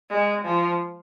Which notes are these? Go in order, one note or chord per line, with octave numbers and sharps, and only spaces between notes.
G#3
F3